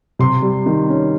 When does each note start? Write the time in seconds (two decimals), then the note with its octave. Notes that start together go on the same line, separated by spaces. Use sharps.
0.19 C3 C6
0.42 G3
0.66 D#3
0.89 C#4